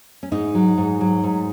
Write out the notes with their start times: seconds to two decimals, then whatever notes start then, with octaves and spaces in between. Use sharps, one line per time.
0.23 C#4
0.32 G#2 D#4
0.55 F#3
0.78 G#2
1.01 F#3
1.23 G#2